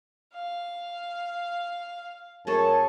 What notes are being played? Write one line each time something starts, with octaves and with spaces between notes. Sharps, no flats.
F5
F#2 G#4 A4 C#5 A5